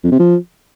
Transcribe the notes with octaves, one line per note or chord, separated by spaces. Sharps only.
F2
C3
F3